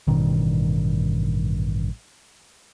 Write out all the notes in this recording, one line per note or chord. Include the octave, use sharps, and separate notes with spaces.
A1 G2 B2 D#3